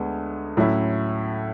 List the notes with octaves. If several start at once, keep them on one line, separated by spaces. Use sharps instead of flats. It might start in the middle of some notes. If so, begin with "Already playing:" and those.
Already playing: D2 G#3 B3
A2 F#3 C#4 E4